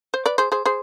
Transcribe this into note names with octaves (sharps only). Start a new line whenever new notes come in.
C5
B4 D5
G#4 C5
G#4 C5
G#4 C5